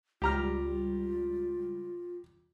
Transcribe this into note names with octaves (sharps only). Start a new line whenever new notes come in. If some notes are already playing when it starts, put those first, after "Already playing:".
C#2 G3 F4 G4 A#5 F6